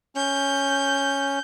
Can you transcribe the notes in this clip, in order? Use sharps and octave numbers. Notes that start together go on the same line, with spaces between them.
C#4 G6